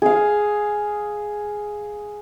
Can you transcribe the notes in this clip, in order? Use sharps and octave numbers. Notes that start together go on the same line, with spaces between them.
G#4 F5